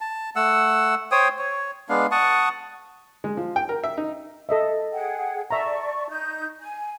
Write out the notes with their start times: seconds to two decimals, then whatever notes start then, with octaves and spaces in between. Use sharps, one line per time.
0.01 A5
0.36 A3 F#5 E6
1.11 C5 C#5 G5 D#6
1.39 C#5
1.89 G#3 B3 D4 F5
2.11 F#5 A5 C#6 D#6
3.24 G#3
3.37 F3
3.56 G5
3.69 A#4
3.84 E5
3.97 D#4
4.49 A4 D#5 E5
4.93 G#4 F#5 G5
5.51 D5 E5 A5 A#5 C#6
6.09 D#4 G6
6.61 G#5